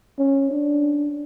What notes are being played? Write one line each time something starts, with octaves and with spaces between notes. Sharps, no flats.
C#4
D4